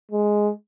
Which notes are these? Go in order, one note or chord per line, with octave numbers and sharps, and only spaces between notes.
G#3